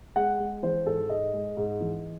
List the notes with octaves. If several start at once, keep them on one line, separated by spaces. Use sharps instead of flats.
G#3 F#5
G#3
E3 C5
G#2 A4
G#2 D#5
G#3
G#2
E3